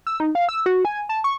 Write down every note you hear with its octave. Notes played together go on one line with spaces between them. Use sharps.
E6
D#4
F5
E6
F#4
G#5
A5
C#6